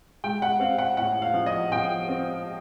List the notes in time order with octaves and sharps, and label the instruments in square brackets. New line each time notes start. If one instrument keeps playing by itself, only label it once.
[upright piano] G#3 G5
F#5
C4 F5
F#5
A2 F#5
F5
F3
D#5
F3 G5
C4